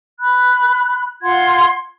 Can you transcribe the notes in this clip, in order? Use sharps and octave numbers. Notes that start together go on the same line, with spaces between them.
B5 F#6
F4 F#5 C6 G#6